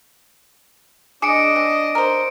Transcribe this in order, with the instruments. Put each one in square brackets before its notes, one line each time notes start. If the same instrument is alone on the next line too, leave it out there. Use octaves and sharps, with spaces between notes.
[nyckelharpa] D4 D#5 [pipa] G#4 [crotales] D6 C#7 D7
[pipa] C4
A#4 C5